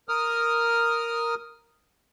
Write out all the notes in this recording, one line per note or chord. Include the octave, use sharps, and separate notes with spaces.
A#4 D#6 F6